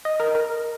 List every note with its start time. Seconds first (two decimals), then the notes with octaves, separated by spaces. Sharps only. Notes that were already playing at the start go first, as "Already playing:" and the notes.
0.05 D#5
0.20 A#4
0.35 A#4